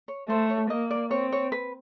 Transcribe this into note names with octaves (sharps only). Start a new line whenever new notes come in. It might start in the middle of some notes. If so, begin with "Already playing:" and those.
C#5
A3 C5
C#5
A#3 D#5
D5
C4 C#5
C#5
B4